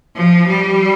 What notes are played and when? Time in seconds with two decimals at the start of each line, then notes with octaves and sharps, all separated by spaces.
0.16 F3
0.49 G3